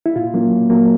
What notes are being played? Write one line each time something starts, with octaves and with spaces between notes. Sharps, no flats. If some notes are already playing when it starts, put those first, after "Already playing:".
E4
A#2 F4
F#3 A#3 C#4
A#2
F#3 A#3 C#4